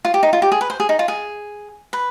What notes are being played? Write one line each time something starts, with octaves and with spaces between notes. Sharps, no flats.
F4
G4
D#4
F4
G4
G#4
B4
C5
G#4
D#4
F4
G#4
B4